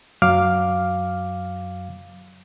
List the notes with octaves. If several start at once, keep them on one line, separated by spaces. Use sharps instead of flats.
F#2 F#3 F5 D6 F6